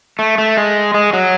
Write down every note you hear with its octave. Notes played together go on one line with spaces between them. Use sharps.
A3
A3
G#3
G#3
F#3